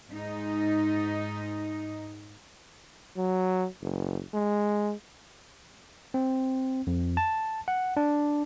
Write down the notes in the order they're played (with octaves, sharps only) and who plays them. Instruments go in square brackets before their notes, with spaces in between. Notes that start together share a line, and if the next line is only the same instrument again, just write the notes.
[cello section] G#2 D#4
[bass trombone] F#3
F#1
G#3
[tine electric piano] C4
F2
A5
F#5
D4